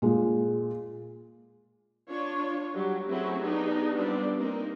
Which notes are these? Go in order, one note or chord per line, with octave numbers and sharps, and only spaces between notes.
A#2 G#3
D4 F4 C#5
F#3 G3 G4
F#3 A3 C4 C#4 E4 G#4
B3 D4 D#4 G4 G#4
G3 B3 C4 D4 F4 D5
A#3 C4 D#4 A#4